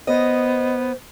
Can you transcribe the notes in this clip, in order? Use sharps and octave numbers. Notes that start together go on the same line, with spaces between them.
B3 C5 D#5